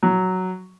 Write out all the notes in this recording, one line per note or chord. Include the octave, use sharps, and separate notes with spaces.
F#3